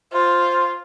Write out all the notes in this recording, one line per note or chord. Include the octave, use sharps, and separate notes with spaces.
F4 C5